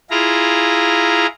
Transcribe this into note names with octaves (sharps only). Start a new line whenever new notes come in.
E4 F4 G#4 A#5